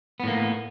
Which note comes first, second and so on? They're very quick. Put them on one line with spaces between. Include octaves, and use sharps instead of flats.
B3 A2 A#3